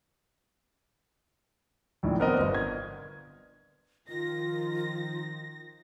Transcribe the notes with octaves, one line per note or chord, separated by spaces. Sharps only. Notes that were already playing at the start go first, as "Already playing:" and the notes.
A#1 A2 D#3
B3 C4 A#4 D5 D#5
G1
G#6
D#3 F3 F4 A#6